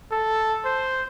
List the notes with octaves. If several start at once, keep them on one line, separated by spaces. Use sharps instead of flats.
A4
C5